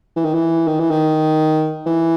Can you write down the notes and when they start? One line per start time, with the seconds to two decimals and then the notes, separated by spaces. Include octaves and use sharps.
0.16 E3
0.25 D#3
0.34 E3
0.67 D#3
0.79 E3
0.91 D#3
1.86 E3